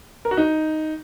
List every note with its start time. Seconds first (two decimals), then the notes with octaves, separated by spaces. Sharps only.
0.25 A#4
0.31 F#4
0.37 D#4